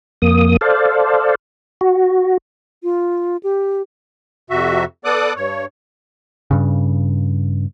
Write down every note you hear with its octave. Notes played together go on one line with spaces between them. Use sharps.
F2 A#3 D#6
A4 C5 D5 F5
F#4
F4
G4
F2 C3 F#4 E5
B3 A4 D5 D6 D#6 F#6
G2 C#5
G2 C#3